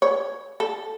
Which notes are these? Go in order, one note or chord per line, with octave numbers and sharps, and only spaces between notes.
C#5
A4